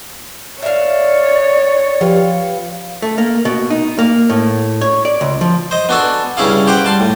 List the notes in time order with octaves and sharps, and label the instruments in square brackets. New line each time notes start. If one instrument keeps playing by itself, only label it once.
[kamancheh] C#5 [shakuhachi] D5 [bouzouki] E5 F5
[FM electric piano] F3 G4 B4 [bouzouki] F4
[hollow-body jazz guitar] A3
A#3
B2
D#4
A#3
A2
C#5
D5
C#2
F3
[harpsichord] C5 D#5
B3 D4 F#4 A4 G#5
G2 C#3 C#4 E4 G#4 F5
G4 C5 F#5 G5
G3 A5 C6
A2